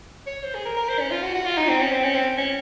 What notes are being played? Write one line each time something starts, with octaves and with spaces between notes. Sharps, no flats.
C#5
C5
G#4
A#4
A#4
C5
C#4
F4
F#4
F#4
F4
D#4
C4
C#4
C4
C#4
C4
C#4